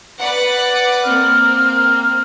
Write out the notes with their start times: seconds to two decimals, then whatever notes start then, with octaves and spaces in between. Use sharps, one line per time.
0.19 B4 D5 F#5
1.04 A#3 C4 F6